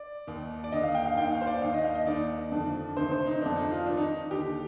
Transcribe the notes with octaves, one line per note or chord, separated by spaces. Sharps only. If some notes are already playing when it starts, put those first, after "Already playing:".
Already playing: D5
D#2 D#3
D5
D#2 D3 D#5
F5
G5
F5
D#2 D#3 G5
F5
C5
D5
D#2 D#3 F5
D#5
F5
D#5
D#2 D#3 D5
F2 D3
D2 C3 D#3 C5
C5
D#4
F2 D3 D4
D#4
F4
G2 D#3 D4
D#4
D#2 D3 G4